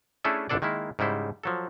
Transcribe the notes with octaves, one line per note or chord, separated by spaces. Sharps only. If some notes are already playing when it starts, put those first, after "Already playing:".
A3 C#4 D4 E4 G#4 A4
G#1 C#2 D3 D4 A4 D5
D#3 G#3 A#3 E4
G#2 C#3 G3 E4 C5
F3 F#3 A4